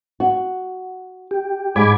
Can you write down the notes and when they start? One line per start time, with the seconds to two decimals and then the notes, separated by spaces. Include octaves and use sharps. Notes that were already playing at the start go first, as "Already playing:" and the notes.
0.20 F#4
1.31 G4
1.76 G#2 B5 D6 G#6